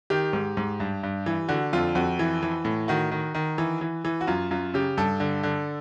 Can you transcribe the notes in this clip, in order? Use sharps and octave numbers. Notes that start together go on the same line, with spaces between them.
D#3 G4
G#2
G#2
G2
G2
E3
D3 F#4
F2 F4
F2 F#4
E3
E3
A2
D#3 F#4
D#3
D#3
E3
E3
E3
F#4
F#2 F4
F#2 F4
C#3 G4
G2 A4
D3
D3